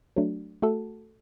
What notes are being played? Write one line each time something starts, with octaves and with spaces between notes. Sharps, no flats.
F#3 A3 D4
A3 F#4 A4